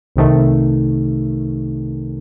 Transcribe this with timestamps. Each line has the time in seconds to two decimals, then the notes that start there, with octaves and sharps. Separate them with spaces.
0.16 C2 C3 D#3 A3